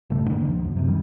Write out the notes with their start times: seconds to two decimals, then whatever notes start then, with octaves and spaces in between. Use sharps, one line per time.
0.10 A1 G2 C#3 A3
0.28 D3 D#3 G#3 A#3
0.46 C#2 F3
0.64 F#2
0.76 F#2 C3
0.88 F1 D#3 G3